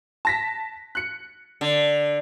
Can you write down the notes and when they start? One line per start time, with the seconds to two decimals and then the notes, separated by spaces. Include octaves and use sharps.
0.25 A5 A#6 B6
0.95 F#6 C#7
1.61 D3